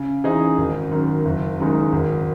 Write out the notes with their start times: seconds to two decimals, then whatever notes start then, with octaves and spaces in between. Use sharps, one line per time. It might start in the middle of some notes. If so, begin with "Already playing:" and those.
Already playing: C#3
0.24 E3 C4 D#4 G#4
0.58 G#1
0.91 F#2 D#3
1.25 F#1
1.59 F#2 D#3 G#3 D#4
1.92 G#1